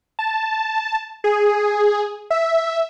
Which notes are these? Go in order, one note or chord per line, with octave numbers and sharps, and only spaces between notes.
A5
G#4
E5